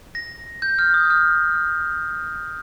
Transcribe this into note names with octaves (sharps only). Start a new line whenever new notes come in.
A#6
G6
F6
D#6
F6